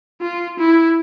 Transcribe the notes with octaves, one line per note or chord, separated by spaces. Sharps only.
F4
E4